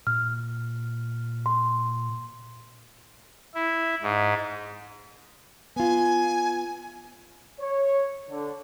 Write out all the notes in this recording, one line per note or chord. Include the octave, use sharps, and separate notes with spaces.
A#2 F6
C6
E4
G#2
B3 F4 G#5
C#5
D3